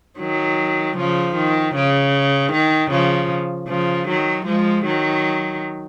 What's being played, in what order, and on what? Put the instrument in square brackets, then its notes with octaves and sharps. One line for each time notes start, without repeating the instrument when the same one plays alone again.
[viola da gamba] D#3 F#3
C#3 F3
D#3
C#3
D#3
C#3 F3
C#3 F3
D#3 F#3
F3 G#3
D#3 F#3